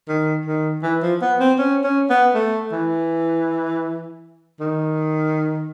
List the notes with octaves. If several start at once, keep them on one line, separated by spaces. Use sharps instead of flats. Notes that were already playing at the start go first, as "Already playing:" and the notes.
D#3
D#3
E3
F3
B3
C4
C#4
C#4
B3
A3
E3
D#3